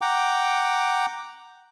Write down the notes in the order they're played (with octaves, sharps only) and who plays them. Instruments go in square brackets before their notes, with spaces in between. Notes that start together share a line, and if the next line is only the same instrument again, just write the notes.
[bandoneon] F#5 G5 A#5 D6